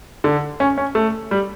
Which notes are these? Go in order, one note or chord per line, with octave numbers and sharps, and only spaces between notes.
D3
C#4
C#4
A3
G3